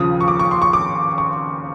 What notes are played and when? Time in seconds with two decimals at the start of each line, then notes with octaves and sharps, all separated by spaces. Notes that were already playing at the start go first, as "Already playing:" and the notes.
Already playing: D#2 C#3 F3 D#6
0.21 C#6
0.28 D6
0.40 C#6
0.51 C6
0.62 C#6
0.73 D6
1.18 C#6